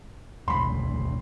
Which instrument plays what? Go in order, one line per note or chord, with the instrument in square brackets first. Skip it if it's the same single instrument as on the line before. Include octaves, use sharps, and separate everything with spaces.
[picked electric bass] E1 A1 D2 [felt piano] B5 C6